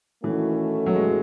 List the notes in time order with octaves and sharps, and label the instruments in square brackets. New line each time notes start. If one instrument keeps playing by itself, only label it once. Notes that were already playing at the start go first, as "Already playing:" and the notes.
[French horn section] D#3 A3 C#4 F#4 A4 [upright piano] E3
[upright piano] F#3
G#3